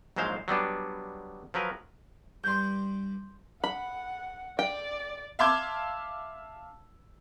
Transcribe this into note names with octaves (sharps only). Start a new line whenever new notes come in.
A#1 G#2 F#3 G#3 C5 F5
F#3 G3 B3 D4
F3 F#3 A#4 B4
G2 G3 C6 G6
F#5 B5
D5 G5
E5 F5 A5 C6 D6 G#6